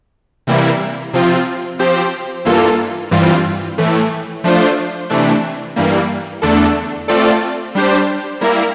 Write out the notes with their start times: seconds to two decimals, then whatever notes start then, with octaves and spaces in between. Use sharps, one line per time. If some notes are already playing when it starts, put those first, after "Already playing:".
0.47 C3 E3 G3 A#3 E4
1.13 C3 F3 C4 F4
1.79 F3 C4 G4 C5
2.45 G2 E3 A#3 F4 A4
3.11 G2 E3 G3 C4 F4
3.78 A2 E3 A3
4.44 F3 A3 D4 F4 C5
5.10 C3 E3 A3 D4
5.76 G2 E3 G3 A#3
6.42 E2 D3 A3 D4 A4
7.08 A3 C4 F4 A4 D5
7.75 G3 D4 G4 C5
8.41 G3 A#3 E4 A#4